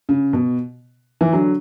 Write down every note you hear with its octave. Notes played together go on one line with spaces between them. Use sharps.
C#3
B2
E3
D3 F#3